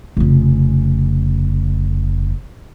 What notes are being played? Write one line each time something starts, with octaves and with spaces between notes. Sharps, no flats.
F1 C#3